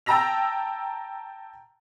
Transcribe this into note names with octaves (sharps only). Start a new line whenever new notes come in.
G5 A5 A#5 E6 A#6 F7